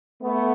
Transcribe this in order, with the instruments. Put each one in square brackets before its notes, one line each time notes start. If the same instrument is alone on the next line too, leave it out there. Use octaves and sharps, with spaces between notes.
[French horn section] A3 B3